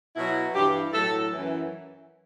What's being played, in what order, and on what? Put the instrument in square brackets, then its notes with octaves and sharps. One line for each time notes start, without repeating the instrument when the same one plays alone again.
[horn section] B2 F#3 E4
G2 E3 G4
A2 F#3 A4
F#2 E3